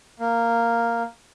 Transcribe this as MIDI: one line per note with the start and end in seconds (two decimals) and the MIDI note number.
0.20 1.03 58